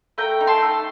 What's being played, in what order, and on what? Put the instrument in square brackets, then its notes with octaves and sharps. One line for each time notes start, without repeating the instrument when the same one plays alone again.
[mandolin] A3 G5 A#5
D#4
A5 C6
A3